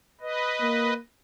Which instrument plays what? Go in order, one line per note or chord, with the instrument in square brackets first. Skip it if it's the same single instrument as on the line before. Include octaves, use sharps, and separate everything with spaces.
[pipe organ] B4 D#5
[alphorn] A#3